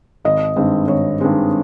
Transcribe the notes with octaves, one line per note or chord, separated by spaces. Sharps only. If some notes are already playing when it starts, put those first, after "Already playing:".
G#1 D#5
G2 D#3 G#3 C4
G#1 C#5
G2 D#3 G#3 C4